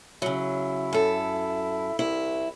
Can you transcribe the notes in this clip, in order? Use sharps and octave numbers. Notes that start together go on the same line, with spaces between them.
C#3 F#3 E4
F#2 A4
C2 E4